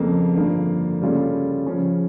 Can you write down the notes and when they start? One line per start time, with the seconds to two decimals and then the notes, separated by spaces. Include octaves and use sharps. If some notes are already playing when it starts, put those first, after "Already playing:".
Already playing: F2 C#3 F3 A#3
0.37 G2 D3 F3 A#3
1.02 C#3 G3 C#4 F4 A4
1.66 C#3 F3 C#4